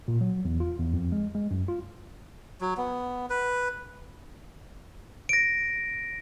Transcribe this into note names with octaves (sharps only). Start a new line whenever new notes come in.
A#2
F#3
E2
F4
E2
F2
G#3
G#3
F#2
F4
F#3
B3
B4
A#6 D7